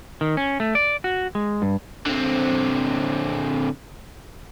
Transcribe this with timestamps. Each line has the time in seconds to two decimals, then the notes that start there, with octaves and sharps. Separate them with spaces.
0.21 D#3
0.37 C#4
0.60 A3
0.75 D5
1.04 F#4
1.35 G#3
1.62 G2
2.06 D3 C4